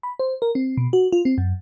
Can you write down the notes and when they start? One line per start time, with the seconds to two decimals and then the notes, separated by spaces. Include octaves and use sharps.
0.03 B5
0.19 C5
0.42 A#4
0.55 C4
0.77 B2
0.93 F#4
1.12 F4
1.25 C4
1.38 F#2